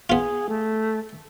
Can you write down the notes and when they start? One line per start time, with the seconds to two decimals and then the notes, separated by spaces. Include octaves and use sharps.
0.10 B3 F4 G#4
0.49 A3